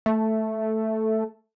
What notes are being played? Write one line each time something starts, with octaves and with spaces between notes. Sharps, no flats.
A3